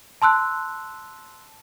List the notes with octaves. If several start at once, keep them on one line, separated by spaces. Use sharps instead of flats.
A5 C6 E6 F#6